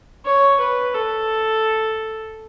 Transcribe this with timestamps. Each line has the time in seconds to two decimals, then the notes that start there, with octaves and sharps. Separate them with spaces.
0.26 C#5
0.60 B4
0.94 A4